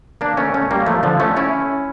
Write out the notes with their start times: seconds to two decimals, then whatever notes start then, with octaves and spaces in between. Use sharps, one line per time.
0.21 A#3 D4
0.37 A3 C#4
0.54 A3 C#4
0.71 G3 A#3
0.86 F3 A3
1.03 D3 F3
1.20 A3 C#4
1.37 C#4 E4